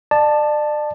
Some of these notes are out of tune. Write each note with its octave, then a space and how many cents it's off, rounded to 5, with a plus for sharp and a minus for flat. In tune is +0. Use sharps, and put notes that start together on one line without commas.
D5 +35 A5 +0